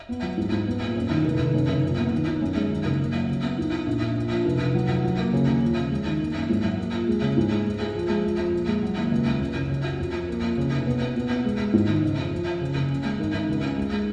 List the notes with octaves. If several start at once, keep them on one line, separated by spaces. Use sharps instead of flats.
B3
F#3
G#2
G#2
B3
A#2
F#2
D#3
F1
D#3
F#2
F#1
A#2
B3
D#3
D#4
F#2
G#3
D#3
F#1
A#3
F#3
C#3
B3
D#4
D#4
A#1
A#1
A#2
F3
F1
F1
F#3
F#3
F#3
A#3
C#3
D#2
F3
C#3
G#3
D#3
A#3
F#2
G#2
F#3
A#3
F4
G#3
C#3
G#2
G#3
G#3
G#4
F3
G#3
F3
F2
A#2
G#3
F#3
D#2
C#2
C#2
F#2
F#1
C#3
F#4
F2
F2
A#3
F3
C#3
F1
B2
B2
B2
B2
G#3
G#3
G#2
D#3
C#3
F2
F3
F3
C#3
F#1
C#4
G#3
G#1
G#1
C#2
C#4
G#3
G#3